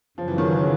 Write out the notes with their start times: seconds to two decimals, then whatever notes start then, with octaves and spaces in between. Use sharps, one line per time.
0.17 F#2 C#3 F3 F#3
0.28 E3
0.38 D#3
0.48 E3